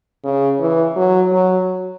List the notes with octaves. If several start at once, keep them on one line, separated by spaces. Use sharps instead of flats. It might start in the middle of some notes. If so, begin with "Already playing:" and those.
C#3
E3
F#3
F#3